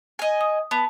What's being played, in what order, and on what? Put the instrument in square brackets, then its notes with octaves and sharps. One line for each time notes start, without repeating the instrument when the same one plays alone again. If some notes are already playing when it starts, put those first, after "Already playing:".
[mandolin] D#5 G#5
[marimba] D#6
[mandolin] B3 [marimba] A5